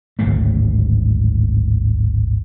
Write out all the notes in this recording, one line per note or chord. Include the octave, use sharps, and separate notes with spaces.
D1 G#1 C#3 A3